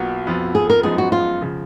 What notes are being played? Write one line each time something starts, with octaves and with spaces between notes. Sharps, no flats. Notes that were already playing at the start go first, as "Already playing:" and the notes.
Already playing: B1 B2 A#3 F4 F#4
F2 F3 B3 F4
G#4
A#4
F#2 F3 G#3 B3 D#4 G#4
F#4
F4
C#3 F3